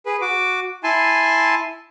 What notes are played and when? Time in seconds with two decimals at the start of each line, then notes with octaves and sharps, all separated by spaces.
0.06 G#4 B4
0.21 F#4 D6
0.84 E4 G#5 A5 C6